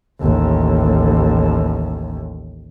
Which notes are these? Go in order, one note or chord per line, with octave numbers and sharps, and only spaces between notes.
A1 D#2